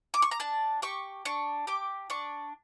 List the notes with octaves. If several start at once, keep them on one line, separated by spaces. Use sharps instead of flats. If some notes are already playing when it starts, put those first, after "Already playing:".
D6
C#6
A#5
D4 A5
G4 C#6
D4 C#6
G4 D6
D4 C#6